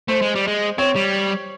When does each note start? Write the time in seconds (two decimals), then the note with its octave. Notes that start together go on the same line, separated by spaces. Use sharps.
0.08 A3 C5
0.22 G#3
0.35 G3
0.47 G#3
0.78 C4 C#5
0.96 G3